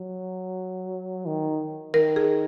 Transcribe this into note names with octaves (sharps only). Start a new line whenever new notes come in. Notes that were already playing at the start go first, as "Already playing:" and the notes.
Already playing: F#3
D#3
D#3 A#4
G#4